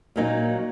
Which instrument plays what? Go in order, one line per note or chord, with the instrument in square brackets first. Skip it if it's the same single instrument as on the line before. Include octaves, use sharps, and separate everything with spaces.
[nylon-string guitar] A#2 F#3 A#3 D#4